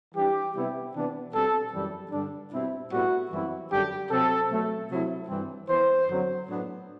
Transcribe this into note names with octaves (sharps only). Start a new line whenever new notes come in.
E3 G3 D4 G4
C3 G3 B3 E4
C3 E3 B3 D4
B2 G3 C4 A4
F#2 E3 G3
G2 D3 G3 D4
B2 G3 C4 E4
A2 G3 B3 E4 F#4
F#2 E3 G3 C4 E4
F#2 D3 G3 D4 G4
C3 F#3 C4 A4
B2 F#3 A3
C3 F#3 C4 E4
G2 E3 G3 C4
E3 B3 E4 C5
F#2 D3 F#3 C4
A2 F#3 B3 D4